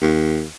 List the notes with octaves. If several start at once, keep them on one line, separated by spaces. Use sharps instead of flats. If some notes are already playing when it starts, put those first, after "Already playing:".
D#2